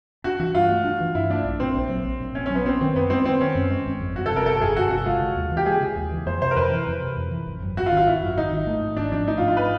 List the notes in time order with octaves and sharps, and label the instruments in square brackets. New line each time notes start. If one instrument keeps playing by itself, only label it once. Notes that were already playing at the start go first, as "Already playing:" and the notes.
[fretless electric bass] D4 [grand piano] F#4
[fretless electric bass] E3 [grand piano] F#4
[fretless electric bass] G2 [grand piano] F4
[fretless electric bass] A3
D4
E3
[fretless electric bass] G2 [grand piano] E4
[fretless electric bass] A3 [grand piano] D4
[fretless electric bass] A#1
[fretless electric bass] A#2 [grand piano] C4
[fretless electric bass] A#1
F#3
A#1
A#2
[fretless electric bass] A#1 [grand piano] C#4
[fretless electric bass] F#3 [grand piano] C#4
[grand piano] B3
[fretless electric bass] B3 [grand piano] C4
[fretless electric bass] D#3 [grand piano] C4
[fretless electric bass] F#2 [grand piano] B3
[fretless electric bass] G#3 [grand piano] C4
[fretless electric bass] B3 [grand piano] C4
[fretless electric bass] D#3 [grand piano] C#4
[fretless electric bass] F#2
G#3
G1
F2
[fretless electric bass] G1 [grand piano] F#4
[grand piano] A4
[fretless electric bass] C3
[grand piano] A#4
[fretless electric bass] G1 [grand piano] A4
[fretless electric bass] F2 [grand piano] G#4
[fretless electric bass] G1 [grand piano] F#4
[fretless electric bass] C3 [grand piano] F#4
[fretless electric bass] G#3 [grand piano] F4
[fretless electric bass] C#3
D#2
E3
[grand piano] G4
[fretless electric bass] G#3 [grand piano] G#4
[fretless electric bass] C#3
D#2
E3
[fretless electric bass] F2 [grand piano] C5
[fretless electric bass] C3 [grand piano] C5
[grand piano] A#4
[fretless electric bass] F2 [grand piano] B4
[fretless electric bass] E3
F2
C3
F2
E3
G#1
F#2
[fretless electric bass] G#1 [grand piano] F#4
[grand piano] F4
[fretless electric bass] D#3
[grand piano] F4
[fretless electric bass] G#1 [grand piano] E4
[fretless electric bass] F#2
[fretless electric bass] G#1 [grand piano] D#4
[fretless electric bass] D#3
A3
G#2
[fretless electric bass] G#1 [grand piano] D4
[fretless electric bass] F3 [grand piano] D4
[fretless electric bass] A3 [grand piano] D#4
[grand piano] F4
[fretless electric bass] G#2
[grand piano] F4
B4